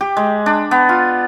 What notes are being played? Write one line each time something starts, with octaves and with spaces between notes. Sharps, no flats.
G4
G#3
D4
B3
F4